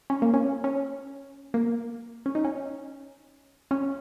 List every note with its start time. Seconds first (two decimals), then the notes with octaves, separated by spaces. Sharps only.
0.10 C#4
0.22 A#3
0.34 C#4
0.64 C#4
1.54 A#3
2.26 C#4
2.35 D#4
2.45 C#4
3.71 C#4